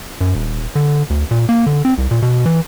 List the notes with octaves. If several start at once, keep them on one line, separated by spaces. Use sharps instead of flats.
F#2
D#1
D3
D2
A#2
A#3
D3
C4
C2
A#2
B2
E3